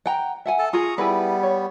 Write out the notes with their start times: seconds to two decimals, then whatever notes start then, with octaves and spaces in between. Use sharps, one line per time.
0.06 F#5 G5 A#5
0.46 E5 F#5 G#5
0.59 A4 A5
0.73 F4 G#4 A#5 C#6 D#6
0.98 G3 B3 E4 G#4 B4
1.43 C#5